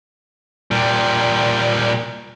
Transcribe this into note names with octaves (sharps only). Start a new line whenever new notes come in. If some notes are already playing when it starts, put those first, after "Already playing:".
A#2 G3